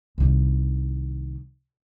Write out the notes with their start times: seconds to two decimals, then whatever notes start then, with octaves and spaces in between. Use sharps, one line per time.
0.18 C2 D#3